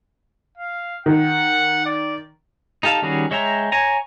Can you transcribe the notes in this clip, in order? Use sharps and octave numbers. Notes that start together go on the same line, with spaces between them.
F5
D#3 F#5
D5
D#4 G4 A4 F5 A5
D#3 G3 C#4 F#4 G#4
G#3 C#5 E5 G5 A#5
C#5 G#5 A#5